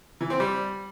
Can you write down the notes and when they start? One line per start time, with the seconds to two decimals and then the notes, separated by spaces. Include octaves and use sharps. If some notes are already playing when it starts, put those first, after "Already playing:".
0.21 E3
0.30 C4
0.40 G3